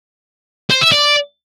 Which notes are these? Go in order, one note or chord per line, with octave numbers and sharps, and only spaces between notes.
C5
E5
D5